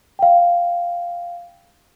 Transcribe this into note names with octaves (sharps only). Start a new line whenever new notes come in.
F5 G5